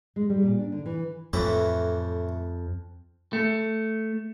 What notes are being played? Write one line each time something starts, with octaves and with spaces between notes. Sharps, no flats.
G#3
G3
A#2
D4
D3
E3
F2 A2 E3 B4
A3